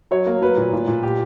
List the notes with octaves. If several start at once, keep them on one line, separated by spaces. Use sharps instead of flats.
F#3 C#5
A#3
F#3 B4
A#2
A#2
A#2
G4